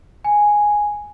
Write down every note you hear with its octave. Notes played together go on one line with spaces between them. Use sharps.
G#5